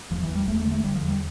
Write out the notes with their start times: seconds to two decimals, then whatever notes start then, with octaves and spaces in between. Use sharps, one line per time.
0.11 E2 F3
0.23 E3
0.29 E2
0.35 G3
0.47 E2 A3
0.59 A3
0.66 D3
0.72 A3
0.83 D3 G3
0.95 F3
1.02 E2
1.08 G3